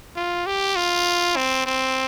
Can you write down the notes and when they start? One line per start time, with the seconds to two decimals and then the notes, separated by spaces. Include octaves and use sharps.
0.16 F4
0.46 G4
0.76 F4
1.36 C4
1.66 C4